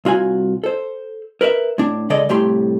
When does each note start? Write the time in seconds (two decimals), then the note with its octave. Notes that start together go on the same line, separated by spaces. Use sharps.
0.05 C2 F4 F#4 G#5
0.64 A4 C5
1.41 A#4 B4 D5 E5
1.78 A2 D4
2.10 C#2 C#3 G#3 A4 D5 D#5
2.29 C2 A2 A3 G4 C6